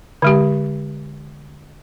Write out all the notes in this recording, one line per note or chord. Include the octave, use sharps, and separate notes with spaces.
D3 G#3 G4